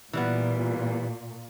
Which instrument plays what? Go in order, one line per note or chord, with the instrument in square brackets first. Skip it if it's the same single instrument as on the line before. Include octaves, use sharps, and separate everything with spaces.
[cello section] A#2 [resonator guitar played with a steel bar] E3 G3 B3